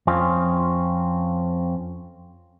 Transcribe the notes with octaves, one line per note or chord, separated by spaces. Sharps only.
F2 C4 C#4 F4